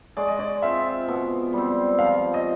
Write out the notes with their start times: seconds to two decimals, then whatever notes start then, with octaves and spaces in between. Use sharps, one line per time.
0.17 G#3 D5
0.28 D#5
0.39 D5
0.62 C4 F4 E5
1.08 B2
1.53 G3 C4
1.99 F3 F5
2.34 D#5